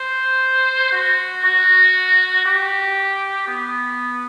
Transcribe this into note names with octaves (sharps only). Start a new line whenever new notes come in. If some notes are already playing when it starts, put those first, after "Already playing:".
Already playing: C5
F#4
F#4
G4
B3